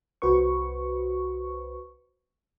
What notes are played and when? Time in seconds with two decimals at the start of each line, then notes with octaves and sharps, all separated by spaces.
0.22 C2 F#4 B4 C5 C#6